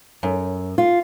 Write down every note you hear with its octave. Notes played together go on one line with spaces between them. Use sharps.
F#2
F4